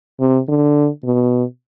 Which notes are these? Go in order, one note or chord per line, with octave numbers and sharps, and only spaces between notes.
C3
D3
B2